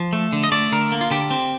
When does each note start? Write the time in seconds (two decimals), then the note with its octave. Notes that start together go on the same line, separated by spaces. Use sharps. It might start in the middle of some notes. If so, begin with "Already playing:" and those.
Already playing: F3
0.13 A3
0.33 D3
0.44 D#5
0.52 A3 D5
0.72 D3 A#4
0.92 A#3
1.01 F4
1.11 D3 G4
1.31 C4